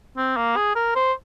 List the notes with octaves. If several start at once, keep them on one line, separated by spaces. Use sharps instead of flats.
C4
A#3
G#4
A#4
C5